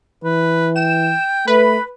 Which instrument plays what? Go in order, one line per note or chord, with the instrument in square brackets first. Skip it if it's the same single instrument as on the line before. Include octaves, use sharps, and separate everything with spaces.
[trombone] E3 [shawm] B4
[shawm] G5 [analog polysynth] E7
[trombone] A3 [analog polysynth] B4 [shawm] B5